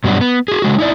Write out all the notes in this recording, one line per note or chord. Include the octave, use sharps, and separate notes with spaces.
G2 B2 F#3 G3 D4 F#4
B3
F#4 G#4
C#3 G#3 F#4
D#4 E4 D5